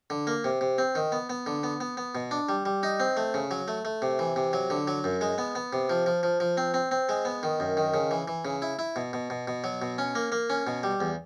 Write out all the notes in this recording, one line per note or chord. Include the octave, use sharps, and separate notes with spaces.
D3
A#3
C3
C3
C4
D#3
B3
B3
D3
B3
B3
B3
B2
D4
G3
G3
D#4
C4
A3
C#3
F#3
A3
A3
C3
E3
C3
F#3
D3
F#3
F#2
G#3
B3
B3
C3
F3
F3
F3
F3
C4
C4
C4
G#3
B3
D#3
F#2
D#3
C#3
E3
E3
C#3
E4
E4
B2
B2
B2
B2
F#3
B2
C#4
A#3
A#3
C#4
B2
G3
E2